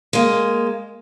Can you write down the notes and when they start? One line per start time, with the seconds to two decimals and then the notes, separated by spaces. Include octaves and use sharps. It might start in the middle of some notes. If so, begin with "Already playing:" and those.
0.13 G#3 A#3